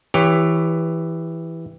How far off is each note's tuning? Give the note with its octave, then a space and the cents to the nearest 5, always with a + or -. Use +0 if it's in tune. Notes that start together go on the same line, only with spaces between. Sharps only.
E3 +0 G4 +20 C#5 +15